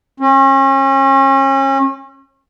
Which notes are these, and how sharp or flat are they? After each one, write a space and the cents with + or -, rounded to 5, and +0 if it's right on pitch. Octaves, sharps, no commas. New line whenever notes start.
C#4 -35